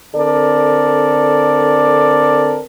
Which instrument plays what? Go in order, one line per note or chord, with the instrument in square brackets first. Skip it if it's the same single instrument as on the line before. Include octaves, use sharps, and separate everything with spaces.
[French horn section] D3 C4 A4 A#4 D5